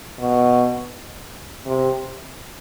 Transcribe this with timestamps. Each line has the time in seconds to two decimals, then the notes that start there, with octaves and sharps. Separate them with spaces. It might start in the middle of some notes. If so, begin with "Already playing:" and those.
0.20 B2
1.66 C3